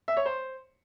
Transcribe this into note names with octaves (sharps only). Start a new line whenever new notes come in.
E5
C#5
C5